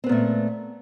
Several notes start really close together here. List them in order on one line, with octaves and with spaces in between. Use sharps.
C4 B3 A#2 A3